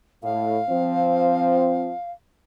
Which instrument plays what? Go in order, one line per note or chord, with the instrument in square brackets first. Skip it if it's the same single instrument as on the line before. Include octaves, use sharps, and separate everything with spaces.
[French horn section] A2 [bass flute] F5
[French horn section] F3 C4 C5